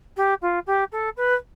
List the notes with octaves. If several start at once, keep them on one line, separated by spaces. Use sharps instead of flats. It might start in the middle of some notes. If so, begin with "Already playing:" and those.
G4
F4
G4
A4
B4